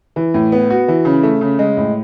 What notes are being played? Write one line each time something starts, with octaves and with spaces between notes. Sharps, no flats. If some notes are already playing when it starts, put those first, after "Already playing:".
E3
A2
B3
F#4
E3
C#3
A3
C#3
G#3
A2